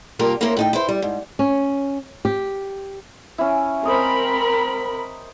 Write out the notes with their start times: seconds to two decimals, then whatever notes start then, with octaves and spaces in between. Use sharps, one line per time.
0.19 G2 C3 A#3 F4 G4 A#4
0.41 A#3 C4 C#4 E4 A#4 C5
0.57 A2 D#4 G5
0.73 E4 B4 C5
0.89 G3
1.02 G#2
1.39 C#4
2.25 G4
3.38 C#4 E4
3.85 C4 A#4 C5 D#5 B5